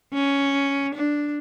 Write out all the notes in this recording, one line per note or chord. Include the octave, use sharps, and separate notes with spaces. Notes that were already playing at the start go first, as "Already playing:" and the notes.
C#4
D4